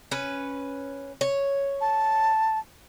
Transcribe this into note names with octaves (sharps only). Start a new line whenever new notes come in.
C#4 B4
C#5
A5